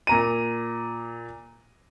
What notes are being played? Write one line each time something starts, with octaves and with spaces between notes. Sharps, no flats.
A#2 A#5 D#7